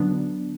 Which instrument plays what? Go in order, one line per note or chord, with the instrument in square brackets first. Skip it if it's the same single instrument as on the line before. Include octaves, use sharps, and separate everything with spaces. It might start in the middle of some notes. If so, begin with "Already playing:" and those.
Already playing: [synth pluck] D3 F#3 B3 D4